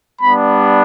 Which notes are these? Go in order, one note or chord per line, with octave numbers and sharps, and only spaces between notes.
G3 B3 D4 B5